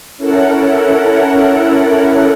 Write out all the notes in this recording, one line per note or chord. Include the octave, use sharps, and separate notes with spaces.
C#4 E4 A4 A#4 F#5